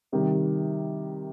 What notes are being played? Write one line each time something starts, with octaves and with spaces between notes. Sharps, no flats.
C3 D#3 G3